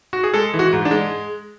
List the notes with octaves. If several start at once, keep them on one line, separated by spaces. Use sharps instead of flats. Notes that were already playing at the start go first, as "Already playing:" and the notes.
F#4
G#4
G#3 A4
E3
F#4
G#2
D4
G#3